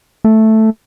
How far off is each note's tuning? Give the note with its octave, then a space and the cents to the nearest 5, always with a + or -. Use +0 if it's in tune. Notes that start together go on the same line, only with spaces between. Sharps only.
A3 +0